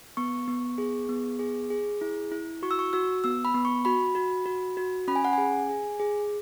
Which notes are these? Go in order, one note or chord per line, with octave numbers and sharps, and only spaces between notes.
B3 C#6
B3
G#4
B3
G#4
G#4
E4
E4
F#4 C#6
E6
C#6
F#4 E6
B3 E6
B5
B3
C#6
F#4 B5
F#4
F#4
F#4
C#4 B5
G#5
F#5
G#4 G#5
G#4
G#4